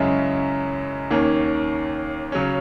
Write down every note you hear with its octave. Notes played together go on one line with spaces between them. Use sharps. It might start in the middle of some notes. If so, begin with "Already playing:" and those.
Already playing: F#2 C#3 G#3 C#4 E4
D#2 D#3 A#3 C#4
C#3 F#3 C#4